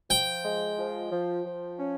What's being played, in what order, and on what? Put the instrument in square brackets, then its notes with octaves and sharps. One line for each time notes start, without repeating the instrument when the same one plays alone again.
[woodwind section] F3 [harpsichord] G5
[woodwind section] G#3
F3
F3
F3
C#4